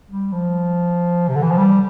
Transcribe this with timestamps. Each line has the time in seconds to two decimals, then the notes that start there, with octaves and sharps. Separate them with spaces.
0.11 G3
0.33 F3
1.29 C3
1.36 D3
1.42 E3
1.51 F3
1.58 G3